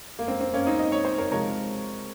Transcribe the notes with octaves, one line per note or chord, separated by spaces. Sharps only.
A#3
C4
C4
A#3 C#4
C4 D#4
D#5
C#5
C5
A#4 C#5
C3 F3 G#3 A#4 C#5